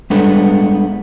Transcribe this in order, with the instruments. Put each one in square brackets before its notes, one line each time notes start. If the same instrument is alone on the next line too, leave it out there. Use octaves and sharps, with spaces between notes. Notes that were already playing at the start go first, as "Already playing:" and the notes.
[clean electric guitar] G3 G#3 B3 D4 A4